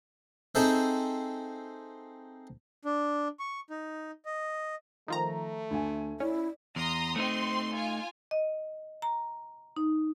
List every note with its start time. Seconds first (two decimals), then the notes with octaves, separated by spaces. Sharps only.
0.55 C4 D#4 G#4 A4 C5 E5
2.85 D4
3.39 C#6
3.70 D#4
4.25 D#5
5.08 D#3 F3 A3 A#5
5.71 D2 G#5
6.20 C#4 E4 D5
6.76 E2 A#5 C6 D#6
7.16 A3 C4 D#4 D#5 C6
7.74 F4 G#5
8.31 D#5
9.02 A#5
9.77 D#4